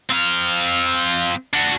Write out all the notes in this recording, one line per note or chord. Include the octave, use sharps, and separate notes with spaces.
C4 F5
D4 F#4